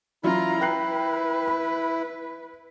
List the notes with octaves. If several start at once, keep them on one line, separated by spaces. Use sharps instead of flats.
E3 F#3 C#4 E4 F4 A#5
B4 G5 F#6 C7
B5